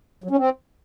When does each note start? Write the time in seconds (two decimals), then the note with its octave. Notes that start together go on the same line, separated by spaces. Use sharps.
0.24 F#3
0.31 C#4
0.37 C4